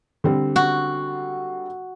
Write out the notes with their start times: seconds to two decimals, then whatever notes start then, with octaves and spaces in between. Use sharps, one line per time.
0.24 D3 G3 C4
0.56 F#4